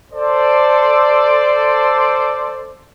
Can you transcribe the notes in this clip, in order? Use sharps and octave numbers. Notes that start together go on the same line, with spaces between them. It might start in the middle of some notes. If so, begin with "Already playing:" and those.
A4 C5 D5